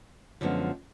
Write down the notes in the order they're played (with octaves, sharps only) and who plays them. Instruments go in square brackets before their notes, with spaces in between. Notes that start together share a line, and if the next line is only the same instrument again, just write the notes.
[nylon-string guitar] F#2 D3 F3 G#3 B3